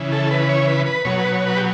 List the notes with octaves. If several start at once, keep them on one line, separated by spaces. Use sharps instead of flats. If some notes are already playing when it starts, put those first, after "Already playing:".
Already playing: C#3 E3
A4
B4
C#5
B4
B4
B2 F#3 C#5
B4
C#5
B4
G4